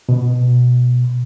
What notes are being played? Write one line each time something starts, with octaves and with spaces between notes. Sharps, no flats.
B2